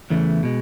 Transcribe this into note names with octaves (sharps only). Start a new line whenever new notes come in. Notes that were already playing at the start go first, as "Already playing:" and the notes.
E2 C#3 E3 A3
B2 G#3